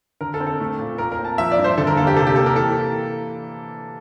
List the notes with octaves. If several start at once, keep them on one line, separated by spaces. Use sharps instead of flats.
D3 A#4
A4
C4
A4
A3
A#2
A#2 A#4
A#4
C4
A5
F3 E5
D5
G2
C5
D3 A4
A#4
A#3 A4
G4
C3 A4
G4
A#3 A4
A#4
E3 A4